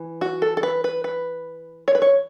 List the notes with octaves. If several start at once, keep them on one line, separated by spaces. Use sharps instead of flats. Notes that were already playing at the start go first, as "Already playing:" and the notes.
Already playing: E3
F#4
A4
A4
B4
B4
B4
C#5
B4
C#5